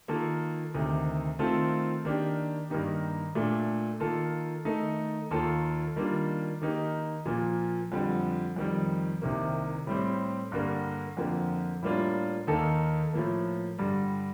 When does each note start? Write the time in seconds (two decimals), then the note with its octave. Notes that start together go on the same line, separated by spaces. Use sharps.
0.08 D#3 A#3 F4 A4
0.74 D2 C3 D#3
1.39 D#3 A3 C4 F4 A4
2.05 D#3 A#3 D4 G4
2.70 G2 D#3 A#3 D#4 G4
3.35 A#2 A3 D4
4.00 D#3 A#3 F4 A4
4.65 D#3 A3 D#4 A4
5.31 D#2 D#3 A#3 F4 A4
5.96 D#3 G3 A#3 D4 F4
6.62 D#3 A#3 D#4 G4
7.26 A#2 F3 A#3
7.92 F2 D3 G3
8.56 F2 D#3 G3
9.22 C2 C3 D#3 A#3
9.87 A2 G3 C4 G4
10.52 G2 D3 G3 A#3
11.17 F2 D3 F3 A#3
11.82 A2 G3 A#3 D4 F4
12.47 D#2 D#3 A#3 D#4 A4
13.13 A2 F3 A#3
13.78 G2 D3 G3